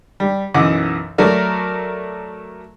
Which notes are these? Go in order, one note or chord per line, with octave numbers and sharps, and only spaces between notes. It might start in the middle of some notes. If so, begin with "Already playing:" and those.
G3
B1 F#2 E3 D#5 F#5 D6
F#3 A3 F#4 A#4 D5